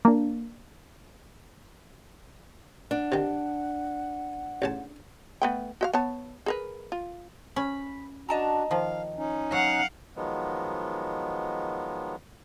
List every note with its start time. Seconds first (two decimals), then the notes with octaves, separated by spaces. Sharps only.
0.05 A#3 D4
2.91 D4 F#5
3.12 C3 D#3
4.62 A1 C#3 A5
5.42 A3 B3 G5
5.81 F#4 E5 F5
5.93 B3 C#5 A5
6.46 G#4 A#4 B4
6.92 F4
7.56 C#4 B5
8.29 D4 F#4 D#5 A5 A#5
8.71 D#3 F3 F5
9.17 C#4 D#4
9.52 F#3 F5 F#5
10.16 D#3 F3 F#3 G#3 B3